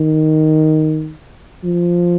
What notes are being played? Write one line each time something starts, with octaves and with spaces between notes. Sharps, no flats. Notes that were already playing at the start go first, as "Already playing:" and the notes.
Already playing: D#3
F3